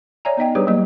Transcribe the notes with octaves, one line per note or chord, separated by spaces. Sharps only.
C#5 D5 E5 G#5 A#5
B3 D#4 D#5 G5
G3 D4 G4 G#4 B4 C#5
F#3 A#3 D#5